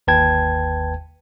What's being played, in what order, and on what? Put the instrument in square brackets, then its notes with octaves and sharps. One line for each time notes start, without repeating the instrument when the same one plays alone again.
[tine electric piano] G1 D#2 B4 G5 A5 G#6